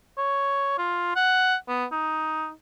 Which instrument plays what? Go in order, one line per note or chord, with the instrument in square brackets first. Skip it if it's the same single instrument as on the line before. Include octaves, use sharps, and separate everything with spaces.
[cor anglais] C#5
F4
F#5
B3
D#4